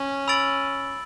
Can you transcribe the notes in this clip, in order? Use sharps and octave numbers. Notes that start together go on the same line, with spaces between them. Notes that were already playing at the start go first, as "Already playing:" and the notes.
Already playing: C#4
B5 E6 A6 D7 F#7